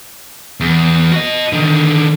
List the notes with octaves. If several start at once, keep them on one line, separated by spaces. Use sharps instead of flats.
E2
F#4 D#5
D3 D#3